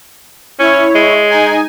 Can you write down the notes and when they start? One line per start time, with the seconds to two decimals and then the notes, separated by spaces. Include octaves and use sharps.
0.59 C#4 E4 C#5
0.95 G#3
1.29 D#4 G#5